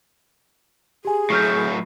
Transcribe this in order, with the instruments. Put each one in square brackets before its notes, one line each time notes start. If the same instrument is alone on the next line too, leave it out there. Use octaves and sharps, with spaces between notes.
[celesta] G4 G#5 [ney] G#4
[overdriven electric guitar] A2 F#3 [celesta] C#6 F6 G6